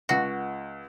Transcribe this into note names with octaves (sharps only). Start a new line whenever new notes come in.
C#2 F#4